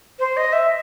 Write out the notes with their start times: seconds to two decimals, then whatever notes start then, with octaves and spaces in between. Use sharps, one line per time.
0.19 C5
0.37 D#5
0.53 E5